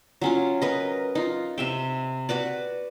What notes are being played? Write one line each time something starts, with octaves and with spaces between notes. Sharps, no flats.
F#3 C#4 F4
A#4 B4 D#5
D#4 F4
C3 E5 G5
F#4 B4 D5